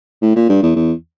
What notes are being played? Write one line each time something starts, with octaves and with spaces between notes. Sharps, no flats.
A2
A#2
G2
E2
E2